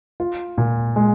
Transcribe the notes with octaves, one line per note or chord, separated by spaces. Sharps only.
F4
A#2
G#3